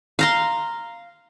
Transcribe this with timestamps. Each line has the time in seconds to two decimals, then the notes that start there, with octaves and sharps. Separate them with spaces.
0.19 F5 A#5 C6